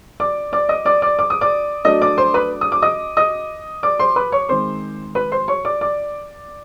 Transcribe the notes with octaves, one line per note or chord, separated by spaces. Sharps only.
D5 D6
D5 D6
D#5 D#6
D5 D6
D5 D6
D6
D#6
D5 D6
F#3 A3 D4 D#5 D#6
D5 D6
C5 C6
B4 B5
D#6
D6
D#5 D#6
D#5 D#6
D5 D6
C5 C6
B4 B5
C#5 C#6
D#3 G#3 C4 C5 C6
B4 B5
C5 C6
C#5 C#6
D5 D6
D5 D6